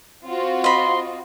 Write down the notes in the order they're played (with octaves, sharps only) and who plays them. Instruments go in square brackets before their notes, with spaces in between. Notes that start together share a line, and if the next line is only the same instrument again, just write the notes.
[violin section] C4 F4 F#4
[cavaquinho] D#5 B5 [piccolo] C6